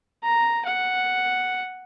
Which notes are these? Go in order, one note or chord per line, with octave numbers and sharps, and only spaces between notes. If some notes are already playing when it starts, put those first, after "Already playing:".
A#5
F#5